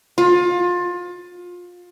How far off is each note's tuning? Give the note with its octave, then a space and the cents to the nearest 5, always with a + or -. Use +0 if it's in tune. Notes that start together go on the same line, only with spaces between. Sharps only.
F4 +25